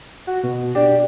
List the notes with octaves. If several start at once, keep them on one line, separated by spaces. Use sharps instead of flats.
F#4
B2
D4 G4